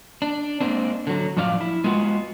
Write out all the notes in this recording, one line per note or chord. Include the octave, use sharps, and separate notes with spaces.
D4
G#3 A#3 C4 D4
D3 F#3
F#2 A2 F3 D5 F5
E4
G#3 B3 F4 F#4